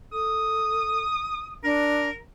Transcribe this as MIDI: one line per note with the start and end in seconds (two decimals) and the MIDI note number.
0.12 1.04 69
0.12 1.56 87
1.64 2.09 62
1.64 2.18 70